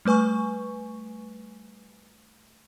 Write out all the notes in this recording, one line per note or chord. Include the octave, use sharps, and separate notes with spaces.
G3 A3 B4 G#5 C#6